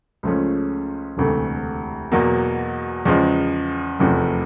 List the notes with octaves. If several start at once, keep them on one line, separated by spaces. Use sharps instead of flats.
C#2 C#3 F3 A3 C#4
E1 D2 C3 E3 A3
E2 B2 F#3 A#3
E2 C#3 F3 G#3
F1 E2 C3 F3 A3